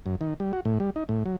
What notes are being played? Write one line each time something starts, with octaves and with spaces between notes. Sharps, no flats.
F#2
D#3
G3
F#4
A2
G3
D#4
A2
F#3